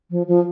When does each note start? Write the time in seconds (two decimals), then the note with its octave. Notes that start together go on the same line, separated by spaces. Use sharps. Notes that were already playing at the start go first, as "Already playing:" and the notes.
0.11 F3
0.28 F3